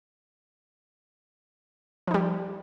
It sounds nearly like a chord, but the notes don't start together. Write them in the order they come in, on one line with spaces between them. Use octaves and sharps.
F3 D#4 G3